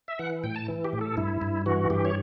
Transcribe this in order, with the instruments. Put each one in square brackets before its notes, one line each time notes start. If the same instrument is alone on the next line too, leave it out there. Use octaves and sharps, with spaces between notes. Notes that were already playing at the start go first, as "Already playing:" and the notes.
[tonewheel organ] E5
E3 F#5
A2 G5
A5
E3
G4
A2
A4
G2 E4
G2
E3 F#4
G2 G4
C#5